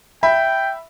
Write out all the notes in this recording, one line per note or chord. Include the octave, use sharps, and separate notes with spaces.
E5 G5 B5